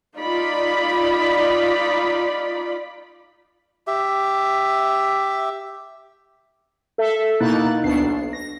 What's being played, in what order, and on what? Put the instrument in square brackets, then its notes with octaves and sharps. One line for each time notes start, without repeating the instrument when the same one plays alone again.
[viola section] D#4 F4 D5 B5
[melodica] G4 E5
[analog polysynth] A4 E5
B2 A#3 D#4 E4 F#6 A6
D2 B2 B3 D4 C7
B1
A#6